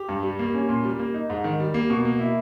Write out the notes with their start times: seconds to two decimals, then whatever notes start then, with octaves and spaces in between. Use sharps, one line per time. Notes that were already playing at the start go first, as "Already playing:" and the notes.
Already playing: G4
0.09 G2
0.23 G3
0.39 A#3
0.54 C#4
0.69 A#2
0.84 G3
0.99 A#3
1.14 D#4
1.30 G#2
1.44 D#3
1.60 G3
1.74 A#3
1.90 B2
2.05 A#3
2.20 E4